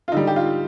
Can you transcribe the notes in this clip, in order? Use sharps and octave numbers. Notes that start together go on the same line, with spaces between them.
F4
D3 G3 D#4
G4
F4